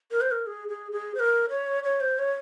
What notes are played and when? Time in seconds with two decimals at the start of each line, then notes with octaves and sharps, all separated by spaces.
0.11 A#4
0.21 C5
0.31 A#4
0.47 G#4
0.68 G#4
0.92 G#4
1.15 C5
1.20 A#4
1.49 C#5
1.84 C#5
2.00 C5
2.19 C#5